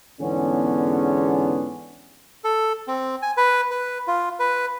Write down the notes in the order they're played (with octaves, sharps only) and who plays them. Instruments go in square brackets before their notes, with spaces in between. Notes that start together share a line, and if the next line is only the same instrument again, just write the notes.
[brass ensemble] E2 G#2 D3 B3 C#4
[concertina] A4
C4
G#5
B4
B4
F4
B4